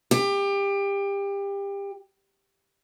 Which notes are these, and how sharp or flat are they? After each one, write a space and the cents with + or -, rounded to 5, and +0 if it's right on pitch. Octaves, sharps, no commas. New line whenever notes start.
G4 +25